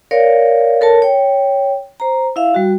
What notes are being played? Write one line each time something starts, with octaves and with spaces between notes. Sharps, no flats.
A#4 C#5 D5 F5
A4 A#4 C#5 A5
C#5 G5
C5 A#5
E4 E5 F5
G3 F#4